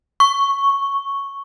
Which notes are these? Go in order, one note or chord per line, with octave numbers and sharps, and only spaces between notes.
C#6